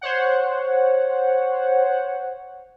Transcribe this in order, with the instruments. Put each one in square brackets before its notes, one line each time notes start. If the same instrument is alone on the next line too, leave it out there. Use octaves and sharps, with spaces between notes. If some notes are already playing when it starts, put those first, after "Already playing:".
[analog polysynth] C5 C#5 F#5